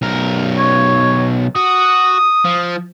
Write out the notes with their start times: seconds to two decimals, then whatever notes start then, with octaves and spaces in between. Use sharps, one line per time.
0.02 B1 A#4
0.59 C#5
1.56 F#4 D#6
2.45 F3